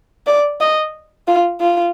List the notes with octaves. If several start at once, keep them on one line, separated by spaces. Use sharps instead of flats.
D5
D#5
F4
F4